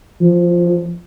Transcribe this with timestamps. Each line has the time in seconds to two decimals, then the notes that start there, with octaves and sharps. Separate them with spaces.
0.21 F3